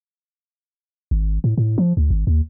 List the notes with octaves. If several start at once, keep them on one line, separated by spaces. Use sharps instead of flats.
G#1
A2
A2
F3
D2
G#1
D#2